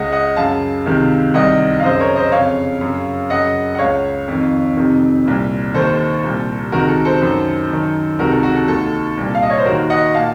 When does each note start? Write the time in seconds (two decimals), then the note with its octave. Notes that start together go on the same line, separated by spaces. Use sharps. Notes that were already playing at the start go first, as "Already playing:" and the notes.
Already playing: C#2 C#3 D#5 F#5
0.12 D#5 F#5
0.36 F#2 C#3 F5 A5
0.86 C#2 C3 D#3
1.34 C2 C3 D#3 D#5 F#5
1.80 F5
1.83 F#2 C#3 C5 D#5
2.00 A#4 C#5
2.16 C5 D#5
2.32 F2 C#3 C#5 F5
2.81 F#2 C#3
3.30 F#2 C#3 D#5 F#5
3.75 F#5
3.79 C#2 C#3 C#5 F5
4.28 F2 D#3
4.76 F2 C3 D#3
5.26 C2 A#2
5.74 D#2 D#3 A4 C5
6.23 C2 A#2
6.72 C#2 C3 D#3 F#4 A#4
6.88 A4
7.05 A4 C5
7.22 F#2 D#3
7.70 F#2 D#3
8.19 C#2 C3 D#3 F#4 A#4
8.31 A4
8.43 F#4
8.55 A4
8.67 D#2 D#3 A4
9.17 C2 A#2
9.35 F5
9.43 D#5
9.50 C#5
9.58 C5
9.65 D#2 D#3 F#4 A#4
9.90 D#5 F#5
10.14 A#2 F5 A5